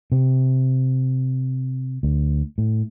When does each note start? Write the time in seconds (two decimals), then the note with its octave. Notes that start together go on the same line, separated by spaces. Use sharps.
0.12 C3
2.03 D2
2.58 A2